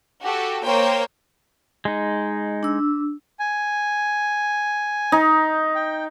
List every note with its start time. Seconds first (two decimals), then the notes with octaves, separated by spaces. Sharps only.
0.22 F#4 G4 A4
0.64 A#3 C5 C#5 G5
1.85 G#3 D#4
2.63 D4 E6
3.39 G#5
5.12 D#4
5.75 G5